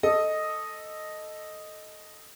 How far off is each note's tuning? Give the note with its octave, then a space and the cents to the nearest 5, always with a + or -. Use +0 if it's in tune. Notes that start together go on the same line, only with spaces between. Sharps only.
A4 +0 D#5 +0